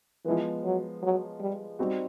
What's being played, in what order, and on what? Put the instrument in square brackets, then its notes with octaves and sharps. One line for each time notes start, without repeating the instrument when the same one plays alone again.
[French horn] E3 [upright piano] F3 G#3 B3
[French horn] F#3
F#3
G3
[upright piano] G3 C4 D#4 F#4